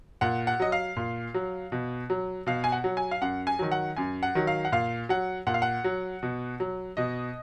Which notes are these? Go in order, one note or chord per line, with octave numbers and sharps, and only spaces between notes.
A#2 F#5
F#5
F#3 D#5
F5
A#2
F#3
B2
F#3
B2 F5
G#5
F#5
F#3
G#5
F5
F#2 F#5
G#5
D#3 F#3
F#5
F#2 G#5
F#5
D#3 F#3
F5
F#5
A#2 F5
F#3 F#5
A#2 F#5
F5
F#5
F#3
B2
F#3
B2 D#5